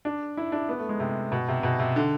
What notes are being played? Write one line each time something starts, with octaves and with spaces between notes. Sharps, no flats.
D4
E4
D4
B3
A3
G#3
C3
B2
C3
B2
C3
D3